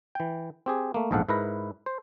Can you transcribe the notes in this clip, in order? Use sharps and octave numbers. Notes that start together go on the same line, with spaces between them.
E3 G5
C4 G4 G#4
A3 A#3
A#1 E2 G#2 A4 F5 F#5
G#2 E4 A#4 B4 A#5
C5